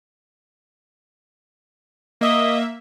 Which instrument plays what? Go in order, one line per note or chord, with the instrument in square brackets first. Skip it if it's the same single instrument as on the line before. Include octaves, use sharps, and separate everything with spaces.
[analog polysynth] A#3 E5 [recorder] D#5